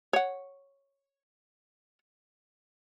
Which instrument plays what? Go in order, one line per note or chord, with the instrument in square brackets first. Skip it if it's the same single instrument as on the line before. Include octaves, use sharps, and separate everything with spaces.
[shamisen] C#5 F#5